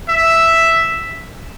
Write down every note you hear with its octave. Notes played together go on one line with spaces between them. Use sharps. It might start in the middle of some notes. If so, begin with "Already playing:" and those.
E5